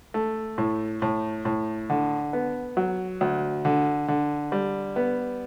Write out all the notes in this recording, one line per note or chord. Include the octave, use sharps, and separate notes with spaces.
A3
A2
A2
A2
D3
B3
F#3
D2
D3
D3
G3
B3